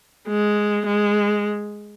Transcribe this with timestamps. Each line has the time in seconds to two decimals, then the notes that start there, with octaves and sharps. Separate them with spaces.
0.28 G#3
0.86 G#3